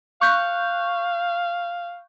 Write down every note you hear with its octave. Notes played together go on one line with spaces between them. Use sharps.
F5 C#6 F#6 G6